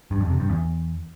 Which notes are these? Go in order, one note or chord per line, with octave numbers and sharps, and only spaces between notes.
G2
F2
C3
G2
E2